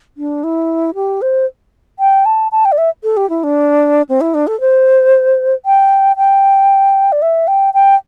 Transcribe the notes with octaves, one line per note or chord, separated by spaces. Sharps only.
D4
E4
G4
C5
G5
A5
A5
G5
D5
E5
A4
G4
E4
D4
C4
E4
D4
A4
C5
G5
G5
D5
E5
G5
G5